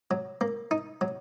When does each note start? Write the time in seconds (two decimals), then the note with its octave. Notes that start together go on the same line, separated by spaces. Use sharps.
0.11 F#3
0.41 A#3
0.71 D#4
1.01 F#3